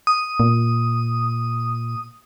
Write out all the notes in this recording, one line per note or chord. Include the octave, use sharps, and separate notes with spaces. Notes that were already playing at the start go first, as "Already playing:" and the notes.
D#6
A#2